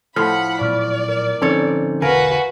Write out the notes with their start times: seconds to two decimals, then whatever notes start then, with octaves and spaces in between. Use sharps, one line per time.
0.16 A2 F3 F#5 B5 F6
0.61 A#2 F#3 B3 D5 C#6 F6
1.08 A#4
1.42 D3 F3 C4 C#4 D#4 A4 C5 C#5
2.02 E1 B1 D3 F#4 A#4 B4 F5 G#5